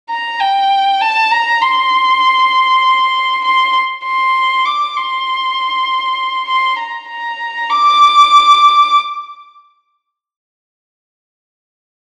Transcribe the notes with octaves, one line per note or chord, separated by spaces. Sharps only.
A#5
G5
A5
A#5
C6
C6
C6
D6
C6
C6
A#5
A#5
D6